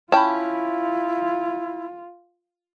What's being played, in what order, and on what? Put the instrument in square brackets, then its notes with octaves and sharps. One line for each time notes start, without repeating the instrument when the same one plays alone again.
[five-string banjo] C#4 G5 [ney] E4 [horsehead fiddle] F4 [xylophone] A5 B5